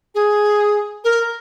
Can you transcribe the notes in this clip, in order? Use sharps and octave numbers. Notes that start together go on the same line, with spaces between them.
G#4
A#4